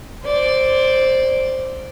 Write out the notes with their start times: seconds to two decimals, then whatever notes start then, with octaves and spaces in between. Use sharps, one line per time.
0.22 C5 D5